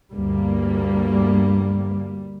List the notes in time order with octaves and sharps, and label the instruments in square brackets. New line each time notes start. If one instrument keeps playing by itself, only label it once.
[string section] D2 G2 A#3 [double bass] G3